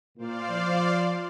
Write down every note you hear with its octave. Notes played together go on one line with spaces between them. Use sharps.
A#2 C5 D5 F5
F3